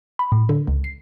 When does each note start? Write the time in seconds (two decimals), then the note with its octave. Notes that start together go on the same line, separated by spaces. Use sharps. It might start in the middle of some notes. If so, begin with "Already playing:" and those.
0.19 B5
0.32 A2
0.49 D3
0.67 C#2
0.84 C7